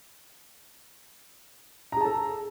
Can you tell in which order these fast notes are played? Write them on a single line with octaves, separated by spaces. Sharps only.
A#5 G#4 A5 A4